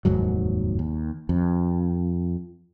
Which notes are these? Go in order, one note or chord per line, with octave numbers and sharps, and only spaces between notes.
F1 D#2 G#2 F#3
D#2
F2